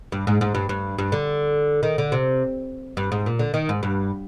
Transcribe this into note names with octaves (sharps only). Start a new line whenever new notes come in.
G2
G#2
G#2
G2
G2
G2
D3
D#3
D3
C3
G2
G#2
A#2
D3
D#3
G#2
G2